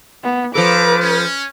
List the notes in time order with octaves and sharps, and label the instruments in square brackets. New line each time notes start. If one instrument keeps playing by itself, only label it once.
[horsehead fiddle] B3
[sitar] F3 A4 [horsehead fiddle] B4 [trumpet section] A#5 D6
[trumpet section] C#4